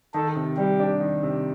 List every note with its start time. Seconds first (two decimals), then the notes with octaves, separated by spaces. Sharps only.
0.14 D#3 A4
0.36 C3
0.57 G3 G4
0.80 D4
1.00 D#3
1.23 C3